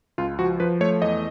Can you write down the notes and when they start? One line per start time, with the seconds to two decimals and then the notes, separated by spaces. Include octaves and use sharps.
0.18 C#2 F4
0.39 F3 F#4
0.60 F3 B4
0.81 A3 C#5
1.02 E2 D#5